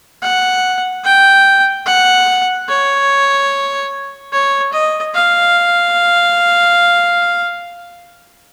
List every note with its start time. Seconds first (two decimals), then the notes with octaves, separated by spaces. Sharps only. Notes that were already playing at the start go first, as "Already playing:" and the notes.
0.22 F#5
1.04 G5
1.86 F#5
2.68 C#5
4.32 C#5
4.72 D#5
5.14 F5